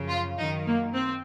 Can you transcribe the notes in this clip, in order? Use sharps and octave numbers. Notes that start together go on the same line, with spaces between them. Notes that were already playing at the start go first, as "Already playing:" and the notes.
Already playing: F#2 C#3 F3
F4
F#2 D#3 D#4
A#3
C4